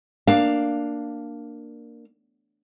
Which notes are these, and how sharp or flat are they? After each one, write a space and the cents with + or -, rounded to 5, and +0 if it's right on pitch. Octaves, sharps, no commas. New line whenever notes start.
A#3 +0 D4 +10 F5 +0